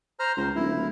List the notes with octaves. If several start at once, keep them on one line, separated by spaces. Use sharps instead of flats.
C5 A#5 F6
C#2 C5
D1 E4